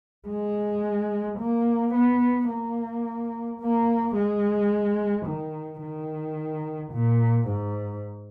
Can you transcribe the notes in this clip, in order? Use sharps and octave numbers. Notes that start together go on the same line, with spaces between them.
G#3
A#3
B3
A#3
A#3
G#3
D#3
D#3
A#2
G#2